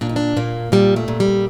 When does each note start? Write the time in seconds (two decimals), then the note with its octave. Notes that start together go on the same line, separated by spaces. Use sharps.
0.01 A#2 D4
0.09 D#4
0.16 D4
0.37 A#2 A#3
0.72 A#2 G3
0.96 A3
1.08 A#2
1.20 G3